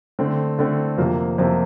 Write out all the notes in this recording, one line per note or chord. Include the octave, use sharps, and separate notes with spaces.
D3 A3 C4
D3 A3 C4
F2 C3 F3 A#3
F2 C3 F3 A#3